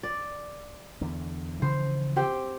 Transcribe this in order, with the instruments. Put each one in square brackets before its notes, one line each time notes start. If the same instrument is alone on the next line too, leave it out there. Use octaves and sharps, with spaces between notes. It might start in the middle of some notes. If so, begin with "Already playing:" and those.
[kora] D5
[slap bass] E2 D3
[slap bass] C#3 E3 F3 [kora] C5
[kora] C4 G4 G5